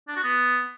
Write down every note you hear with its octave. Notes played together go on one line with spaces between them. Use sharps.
D4
F#4
B3